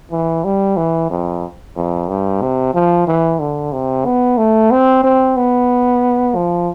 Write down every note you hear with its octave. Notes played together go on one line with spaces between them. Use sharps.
E3
G3
E3
F2
F2
G2
C3
F3
E3
D3
C3
B3
A3
C4
C4
B3
F3